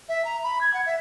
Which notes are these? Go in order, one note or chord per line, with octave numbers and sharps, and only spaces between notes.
E5
A#5
B5
G#6
F#5
E5